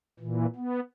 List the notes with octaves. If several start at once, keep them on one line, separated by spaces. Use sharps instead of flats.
A#2 E3
B3